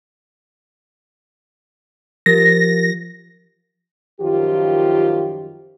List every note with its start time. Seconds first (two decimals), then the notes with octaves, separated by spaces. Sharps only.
2.26 F3 G4 A#4 A6 A#6
4.21 F#2 D#3 F3 F4 G4